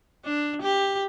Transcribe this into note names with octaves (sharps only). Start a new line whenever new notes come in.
D4
G4